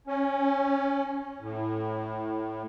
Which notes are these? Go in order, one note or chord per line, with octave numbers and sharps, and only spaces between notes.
C#4
A2